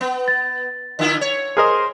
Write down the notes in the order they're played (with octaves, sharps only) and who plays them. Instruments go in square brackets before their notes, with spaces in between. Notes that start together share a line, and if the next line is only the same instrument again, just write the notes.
[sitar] B3
[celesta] A6
[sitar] D3 E4 F4
C#5
[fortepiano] G#4 A#4 D#5 [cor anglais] C5